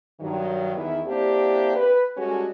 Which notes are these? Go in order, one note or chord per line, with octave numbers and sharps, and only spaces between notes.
G2 D#3 F#3
E2 D#3 B3 E4
A#3 C4 D4 E4 G4
B4
G3 G#3 C#4 F#4 A4